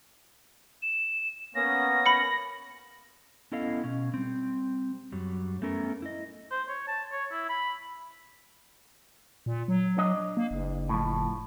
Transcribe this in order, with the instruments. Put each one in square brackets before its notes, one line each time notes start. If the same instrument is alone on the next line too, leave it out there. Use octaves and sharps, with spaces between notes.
[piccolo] E7
[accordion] A#3 B3 C#4 [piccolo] A#6
[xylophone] B5 C#7
[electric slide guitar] B3 C#4 E4 A4 D#5 F5
B2 C#4
G3 C4
F#2 F#3 G3
A3 B3 C#4 A4 A#4
E4 D#5
[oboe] C5
C#5
A5
C#5
E4
B5
[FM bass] A#2
F#3
[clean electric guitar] D4 D#5
[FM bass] A#3
F#1
[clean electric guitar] A2 F3